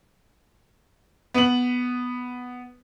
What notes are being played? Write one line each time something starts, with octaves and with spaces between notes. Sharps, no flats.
B3 F#7